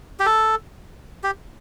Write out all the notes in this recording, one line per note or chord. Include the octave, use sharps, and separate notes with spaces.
G4
A4
G4